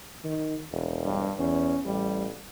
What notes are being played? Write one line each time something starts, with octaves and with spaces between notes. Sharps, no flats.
D#3
E1
G2
E2 C#4
A1 G3